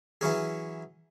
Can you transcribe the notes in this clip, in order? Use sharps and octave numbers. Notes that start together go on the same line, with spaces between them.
E3 F#3 C#4 G#4